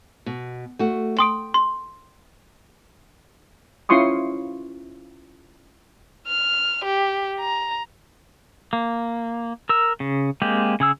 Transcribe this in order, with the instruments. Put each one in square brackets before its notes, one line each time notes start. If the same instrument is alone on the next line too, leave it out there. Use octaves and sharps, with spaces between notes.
[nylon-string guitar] B2
A3 F#4
[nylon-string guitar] G5 [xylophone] C6 D#6 D7
[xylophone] C6
[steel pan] C#4 E4 F4 C6 C#6 D#6
[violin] F6
G4
A#5
[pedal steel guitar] A#3
A#4 E6
C#3
G#3 A#3 C4 G4
C#3 G#4 E6